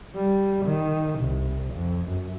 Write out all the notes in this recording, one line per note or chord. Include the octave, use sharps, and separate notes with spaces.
G3
D#3
C2
F2
F#2